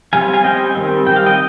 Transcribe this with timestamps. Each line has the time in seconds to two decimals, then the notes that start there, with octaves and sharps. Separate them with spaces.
0.13 G3 C4 F5 G#5
0.34 F5 G#5
0.43 G3 C4 D#5 G5
0.75 D#3 G3 C4
1.07 D#3 G3 C4 G5
1.16 F5
1.26 D#5 G5